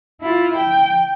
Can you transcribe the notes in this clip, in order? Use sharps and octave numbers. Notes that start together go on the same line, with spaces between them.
E4 F4
G5